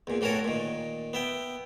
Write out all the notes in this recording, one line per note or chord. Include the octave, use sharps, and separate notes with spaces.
E2 A#2
A2 E3 F#4 A#4 C#5 A5
A#2 D#3
B3 E5 G5